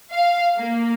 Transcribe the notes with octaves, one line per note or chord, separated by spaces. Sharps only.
F5
A#3